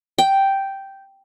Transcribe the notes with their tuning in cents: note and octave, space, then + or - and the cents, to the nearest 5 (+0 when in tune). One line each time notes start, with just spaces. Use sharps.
G5 -5